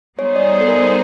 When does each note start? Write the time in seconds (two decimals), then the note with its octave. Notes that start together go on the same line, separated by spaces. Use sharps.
0.18 G3 B3 D#4 G#4 C5 C#5
0.36 D5
0.52 D5
0.61 A4
0.68 A#4
0.84 A#4